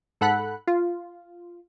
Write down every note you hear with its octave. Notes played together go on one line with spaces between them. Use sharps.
G#2 A4 F#5 B5 F#6
F4